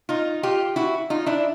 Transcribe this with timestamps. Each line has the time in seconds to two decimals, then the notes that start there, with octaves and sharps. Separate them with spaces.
0.09 D#4 F4
0.43 F4 G4
0.76 E4 F#4
1.10 D#4 F4
1.26 D4 E4